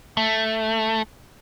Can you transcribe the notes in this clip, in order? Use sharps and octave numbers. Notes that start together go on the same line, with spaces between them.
A3